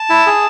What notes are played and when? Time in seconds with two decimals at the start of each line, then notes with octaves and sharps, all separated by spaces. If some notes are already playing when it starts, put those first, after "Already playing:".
Already playing: A5
0.10 E4
0.27 G#4